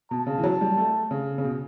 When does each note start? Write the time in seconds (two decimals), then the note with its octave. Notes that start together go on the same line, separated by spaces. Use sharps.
0.11 B2 A5
0.27 C#3
0.38 E3
0.43 F#3
0.61 G3
0.78 A3
1.11 C#3
1.38 C#3
1.44 B2